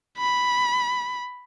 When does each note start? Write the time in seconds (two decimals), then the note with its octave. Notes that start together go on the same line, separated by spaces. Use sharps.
0.18 B5